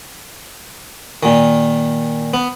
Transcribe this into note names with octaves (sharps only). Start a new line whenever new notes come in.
A#2 D#3
B3